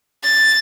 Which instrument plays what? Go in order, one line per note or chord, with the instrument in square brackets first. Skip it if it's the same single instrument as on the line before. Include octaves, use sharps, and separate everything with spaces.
[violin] A6